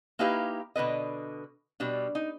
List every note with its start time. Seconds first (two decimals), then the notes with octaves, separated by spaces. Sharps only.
0.19 A#3 D#4 E4 G4 B4 F5
0.76 B2 D3 B4 D#5
1.80 B2 G3 D4
2.15 D#4